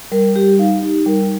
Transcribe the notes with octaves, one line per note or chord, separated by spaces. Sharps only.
G3 A#4
G3 G4
D#4 F5
D#4 G4
G3 A#4